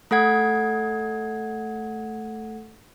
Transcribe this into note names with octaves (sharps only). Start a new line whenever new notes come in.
A3 A4 F#5 G#6